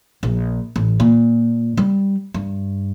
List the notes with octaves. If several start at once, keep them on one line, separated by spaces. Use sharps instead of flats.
A#1
A1
A#2
G3
G2